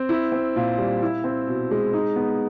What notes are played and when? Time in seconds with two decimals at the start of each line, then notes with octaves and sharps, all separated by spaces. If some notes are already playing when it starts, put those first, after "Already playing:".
Already playing: C4
0.09 E4
0.32 C4
0.56 A#2
0.78 G3
1.02 E4
1.24 C4
1.47 B2
1.71 G#3
1.93 D#4
2.16 B3